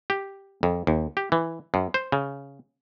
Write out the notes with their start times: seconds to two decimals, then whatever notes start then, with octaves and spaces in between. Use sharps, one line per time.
0.10 G4
0.63 F2
0.87 D#2
1.17 G4
1.32 E3
1.74 F#2
1.94 C5
2.12 C#3